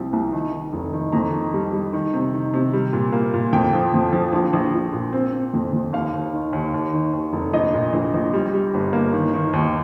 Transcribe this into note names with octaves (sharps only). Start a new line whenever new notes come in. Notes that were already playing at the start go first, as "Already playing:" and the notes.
Already playing: C2 F3 C4
C2
D#3
D#3
F1
D#3
F2 A#5
D#3
G3
G3
D#3
C3
D#3
C3
G3
A#2
A#3
A#2
F2 G5
F3
F2
F3
A#1
A#1
A#1
A#2
C4
C4
F2
F2
D#2 F5
D#2
D#3
D#2
D#2
D#3
D#2
F1
A#1 D#5
A#2
A#1
A#1
G3
G3
G1
A#3
D#3
D#3
D#2